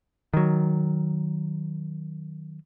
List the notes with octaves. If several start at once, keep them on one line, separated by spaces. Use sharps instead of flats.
D#3 F#3